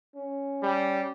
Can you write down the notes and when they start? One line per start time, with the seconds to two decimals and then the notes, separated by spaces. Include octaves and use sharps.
0.15 C#4
0.63 G3